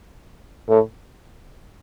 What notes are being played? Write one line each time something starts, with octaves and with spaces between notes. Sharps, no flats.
A2